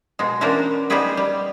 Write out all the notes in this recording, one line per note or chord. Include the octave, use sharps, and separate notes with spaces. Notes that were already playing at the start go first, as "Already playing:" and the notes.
B2 G#3
E3 C#4 D4 F#4 A#4 C5
G3 B3 D#4 F#4 G#4 B4
G3